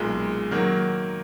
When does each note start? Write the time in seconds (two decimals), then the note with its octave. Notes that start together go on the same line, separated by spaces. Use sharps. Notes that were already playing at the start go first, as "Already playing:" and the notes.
Already playing: B1 A#2 G#3
0.51 D#3 F#3 A#3